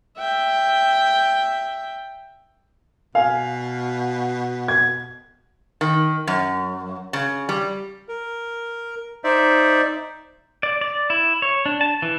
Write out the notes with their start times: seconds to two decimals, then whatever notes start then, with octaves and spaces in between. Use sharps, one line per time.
0.17 E5 G5
3.15 B2 F5 G#5
4.68 G#6
5.81 D#3
6.27 F#2
7.13 C#3
7.49 G3
8.08 A#4
9.24 D#4 C5 D5 E5
10.63 D5
10.81 D5
11.10 E4
11.42 C#5
11.66 D4
11.81 A5
12.02 E3